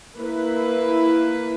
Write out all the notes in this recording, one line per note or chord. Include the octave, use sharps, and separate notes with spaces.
A#3 E4 B4